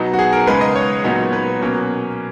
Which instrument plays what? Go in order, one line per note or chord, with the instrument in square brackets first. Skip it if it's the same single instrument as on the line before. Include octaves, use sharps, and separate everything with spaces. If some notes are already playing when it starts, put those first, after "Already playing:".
Already playing: [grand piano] B2 F#3 B3 D#4
F#4
G#4
A#4
C#3 G#3 D#4 B4
D#5
C#5
A#2 F#3 B3 D#4
B4
B2 F#3 A#3 C#4